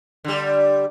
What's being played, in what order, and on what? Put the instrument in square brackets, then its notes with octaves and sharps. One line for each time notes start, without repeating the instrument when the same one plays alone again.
[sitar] D3 G3